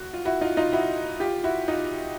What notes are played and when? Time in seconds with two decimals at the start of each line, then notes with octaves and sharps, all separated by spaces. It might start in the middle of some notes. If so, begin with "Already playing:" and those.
Already playing: F#4
0.13 F4
0.25 E4 F#4
0.41 D#4 F4
0.57 D#4 F4
0.73 E4 F#4
1.20 F4 G4
1.44 E4 F#4
1.68 D#4 F4